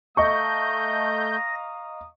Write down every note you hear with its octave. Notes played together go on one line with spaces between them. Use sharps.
A3 D#5 F5 A#5 C#6 D#6 G6 A#6